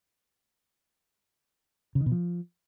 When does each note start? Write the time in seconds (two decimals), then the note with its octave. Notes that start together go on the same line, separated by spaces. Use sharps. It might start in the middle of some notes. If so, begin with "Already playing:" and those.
1.95 C#3
2.01 D#3
2.06 B2
2.12 F3